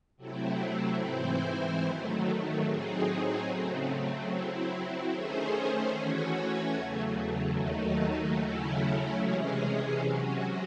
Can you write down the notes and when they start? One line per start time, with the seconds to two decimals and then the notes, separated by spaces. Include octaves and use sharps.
0.17 C3 F#3 A3 C4 E4
0.98 G#2 E3 C4 E4 C5
1.81 D#3 F#3 A3
2.62 A2 F#3 C4 D#4 G#4
3.44 C#3 F#3 A3 C4
4.26 F#3 C4 E4
5.08 D#3 A3 C#4 G#4 C5
5.90 E3 A3 C#4 F#4 C#5
6.72 E2 C#3 F#3 A3
7.54 D#2 D#3 F#3 A3 D#4
8.35 C#3 F#3 A3 C#4 E4
9.17 C3 E3 G#3 C#4 G#4
10.00 C3 F#3 C#4 F#4